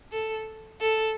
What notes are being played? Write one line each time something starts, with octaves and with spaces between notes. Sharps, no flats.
A4
A4